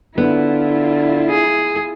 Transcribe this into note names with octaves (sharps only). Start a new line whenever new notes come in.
D3 B3 E4 F4
G#4